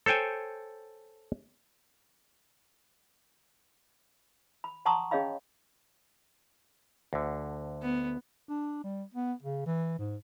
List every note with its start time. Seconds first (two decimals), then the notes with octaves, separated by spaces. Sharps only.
0.06 A4 C5 C#5 G5 G#5
4.64 B5
4.86 F#5 A5 A#5 C6 C#6 D#6
5.11 C#4 G#4 C#5 D#5 F5 B5
7.13 D2 D3
7.81 B3
8.49 D4
8.84 G3
9.14 B3
9.43 C#3
9.66 E3
9.99 G#2